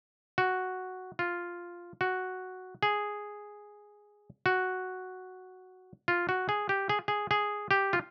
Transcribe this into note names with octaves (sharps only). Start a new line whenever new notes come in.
F#4
F4
F#4
G#4
F#4
F4
F#4
G#4
G4
G#4
G#4
G#4
G4
F4